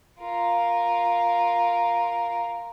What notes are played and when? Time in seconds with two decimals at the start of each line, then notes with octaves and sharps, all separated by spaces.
0.20 F4 A#4